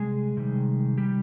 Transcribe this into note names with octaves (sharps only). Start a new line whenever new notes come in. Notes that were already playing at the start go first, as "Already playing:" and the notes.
Already playing: C3 G3 G#3 G#4
C3 D#3 G3
G3 G4